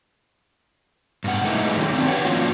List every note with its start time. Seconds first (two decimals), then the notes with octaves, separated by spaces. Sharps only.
1.24 G2 B2 F#5
1.44 G#3 A3 B3 D#4 E4 G#4
1.76 D3 D#3 F#3
1.93 C4 D4 D#4
2.05 G4 B4 C#5 F#5
2.25 F3 A#3 C#4 D4 F4 F#4